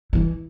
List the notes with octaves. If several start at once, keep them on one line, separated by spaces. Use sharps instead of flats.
E3